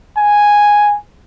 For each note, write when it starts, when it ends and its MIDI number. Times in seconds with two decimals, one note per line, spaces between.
0.17 0.96 80